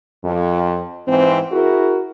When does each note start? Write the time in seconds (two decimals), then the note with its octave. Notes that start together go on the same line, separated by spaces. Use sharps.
0.25 F2
1.07 G#2 E3 C4
1.52 E4 F#4 G#4 A#4